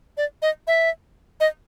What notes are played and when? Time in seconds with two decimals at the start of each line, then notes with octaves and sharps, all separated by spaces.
0.17 D5
0.42 D#5
0.67 E5
1.40 D#5